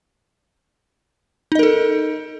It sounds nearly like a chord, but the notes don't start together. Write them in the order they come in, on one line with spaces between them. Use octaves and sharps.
D#4 D#5 A#4 A4